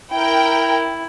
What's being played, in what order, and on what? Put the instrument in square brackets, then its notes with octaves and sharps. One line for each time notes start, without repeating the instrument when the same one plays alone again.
[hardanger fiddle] E4 [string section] A#4 G5